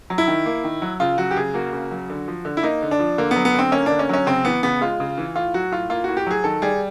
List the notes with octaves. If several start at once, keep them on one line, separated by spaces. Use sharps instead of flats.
F#3
E4
D#3
A#3
D#3
F#3
C#3 F4
F#3 F#4
G4
C#3 G#4
A#3 F#4
C#3
F#3
D3
F3
D3
E4
A#3 D#4
D3
D4
F3
D3 A#3
B3
F#3
B3
D3 C4
A#3 C#4
D3 D4
C#4
F#3 C#4
C#3 C4
E3 B3
C#3 B3
G#3 F4
C#3
E3
A2 F4
F#3 F#4
A2 F4
A#3 F4
A2 F#4
G4
F#3 G#4
D#3 A4
G3 G#4